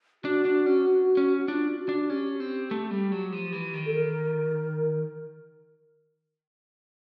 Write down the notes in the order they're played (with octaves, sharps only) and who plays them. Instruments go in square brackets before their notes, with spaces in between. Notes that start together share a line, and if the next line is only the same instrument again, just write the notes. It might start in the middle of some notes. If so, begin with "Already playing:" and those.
[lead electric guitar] D4 [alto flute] F#4
[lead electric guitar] D4
C#4
C#4
[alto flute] F#4
[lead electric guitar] D4 [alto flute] F4
[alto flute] F#4
[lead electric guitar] D4
[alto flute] F#4
[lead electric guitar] C#4 [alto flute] G4
[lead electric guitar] C4
A3
G3
F#3
F3
E3
D#3
[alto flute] A4
A#4